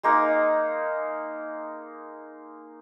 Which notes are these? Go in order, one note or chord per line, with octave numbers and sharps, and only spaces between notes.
G#3 A#3 D#4